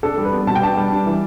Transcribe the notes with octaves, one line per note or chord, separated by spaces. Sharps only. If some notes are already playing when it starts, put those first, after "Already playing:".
D4 A4
G3
B4
B3
B2 A5
G5
D4 A5
G3
D4
E3